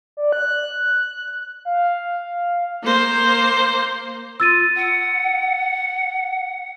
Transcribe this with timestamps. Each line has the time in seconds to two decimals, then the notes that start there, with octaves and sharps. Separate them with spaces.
0.17 D5
0.32 F#6
1.65 F5
2.83 A#3 C5
4.40 F4 E6 A6 D#7
4.76 F#5